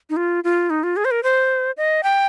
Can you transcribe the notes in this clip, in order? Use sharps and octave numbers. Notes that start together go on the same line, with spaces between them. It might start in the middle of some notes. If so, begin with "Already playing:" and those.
D#4
F4
F4
D#4
F4
G#4
C5
A#4
C5
D#5
G5